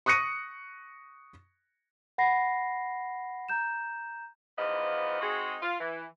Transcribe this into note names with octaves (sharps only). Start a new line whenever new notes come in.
C#6 D#6 F#6 A#6 C#7 D#7
F#5 B5 A#6 C7
A#5 G6 E7
G#2 E3 F3 B3 D#5 F5
G#3 C4 D#4 F#4 G#4
F4
E3